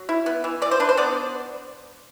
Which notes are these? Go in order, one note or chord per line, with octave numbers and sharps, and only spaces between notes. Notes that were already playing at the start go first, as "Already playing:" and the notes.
Already playing: F#3
E4
B3
E3
E3 D5
C5
D4 B4
C5
B3 D5